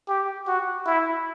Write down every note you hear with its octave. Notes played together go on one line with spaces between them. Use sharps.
G4
F#4
E4